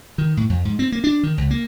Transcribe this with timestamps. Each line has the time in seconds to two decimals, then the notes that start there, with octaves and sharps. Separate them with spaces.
0.18 D#3
0.37 A2
0.49 F2
0.65 G#2
0.79 C4
0.92 A#3
1.04 D4
1.23 D#3
1.38 C#2
1.51 A#3